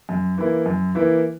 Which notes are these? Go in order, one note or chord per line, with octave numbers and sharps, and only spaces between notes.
F#2
E3 A#3 E4
F#2
E3 A#3 E4